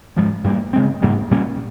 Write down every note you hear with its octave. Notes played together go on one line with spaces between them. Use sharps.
G#2 F3 G#3
G2 G3 A#3
C#3 G#3 C4
G#2 G3 A#3
A#2 G3 A#3 C#4